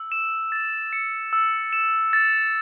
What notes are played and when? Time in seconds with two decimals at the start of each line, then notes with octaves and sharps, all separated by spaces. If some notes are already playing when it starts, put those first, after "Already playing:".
Already playing: E6
0.12 E7
0.52 A6
0.93 C#7
1.33 E6
1.73 E7
2.13 A6